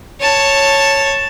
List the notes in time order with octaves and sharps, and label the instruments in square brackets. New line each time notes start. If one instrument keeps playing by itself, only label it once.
[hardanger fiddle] C#5 A5